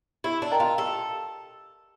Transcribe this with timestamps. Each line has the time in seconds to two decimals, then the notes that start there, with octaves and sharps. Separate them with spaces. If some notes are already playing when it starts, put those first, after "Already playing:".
0.24 E4 G4
0.42 D4
0.52 A#4 D#5 G5 A#5
0.60 F4
0.78 G4 A4